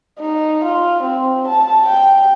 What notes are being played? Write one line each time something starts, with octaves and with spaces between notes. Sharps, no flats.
D#4
F4
C4
A5
G5